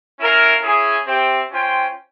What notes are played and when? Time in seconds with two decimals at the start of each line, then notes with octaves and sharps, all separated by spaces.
0.19 C#4 E4 A#4 F5
0.63 C#4 E4 G#4
1.07 C4 G4 C5 E5 G5
1.52 C#4 F4 C5 G5